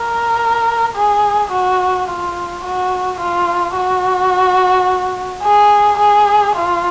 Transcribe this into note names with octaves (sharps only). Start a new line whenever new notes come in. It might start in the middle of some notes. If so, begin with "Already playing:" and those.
Already playing: A#4
G#4
F#4
F4
F#4
F4
F#4
G#4
G#4
F4